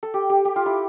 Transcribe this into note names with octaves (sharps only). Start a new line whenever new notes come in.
A4
G4
G4
G4
F4
E4